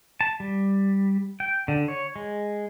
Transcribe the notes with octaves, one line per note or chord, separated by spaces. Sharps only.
A5
G3
G5
D3
C#5
G#3